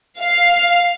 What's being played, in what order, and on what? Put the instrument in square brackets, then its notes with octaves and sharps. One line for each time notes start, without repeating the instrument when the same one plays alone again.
[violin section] F5